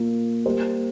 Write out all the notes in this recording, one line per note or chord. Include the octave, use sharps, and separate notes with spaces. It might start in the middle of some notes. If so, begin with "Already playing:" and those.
Already playing: A#2 A#3 F4
G3 A#3 G4 C5